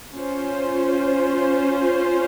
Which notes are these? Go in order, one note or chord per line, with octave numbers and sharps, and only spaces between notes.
C#4 F4 C5